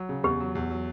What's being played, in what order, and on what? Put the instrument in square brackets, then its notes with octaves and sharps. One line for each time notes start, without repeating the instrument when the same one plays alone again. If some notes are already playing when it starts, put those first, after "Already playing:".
Already playing: [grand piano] F#3
C#3
[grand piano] E2 [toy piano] G4
[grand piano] F#3
E2
F#3